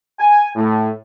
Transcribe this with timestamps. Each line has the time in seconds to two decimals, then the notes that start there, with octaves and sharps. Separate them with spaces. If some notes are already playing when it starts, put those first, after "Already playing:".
0.19 G#5
0.55 A2